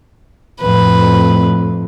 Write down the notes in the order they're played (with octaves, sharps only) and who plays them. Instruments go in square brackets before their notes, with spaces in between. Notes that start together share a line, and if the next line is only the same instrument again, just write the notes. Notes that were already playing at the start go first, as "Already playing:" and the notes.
[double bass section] F2 A2 [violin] B4